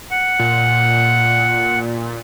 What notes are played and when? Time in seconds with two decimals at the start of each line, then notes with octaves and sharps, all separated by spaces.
0.11 F#5
0.39 A#2